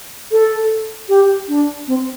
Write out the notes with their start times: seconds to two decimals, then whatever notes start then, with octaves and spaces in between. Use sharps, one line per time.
0.32 A4
1.09 G4
1.48 D4
1.88 C4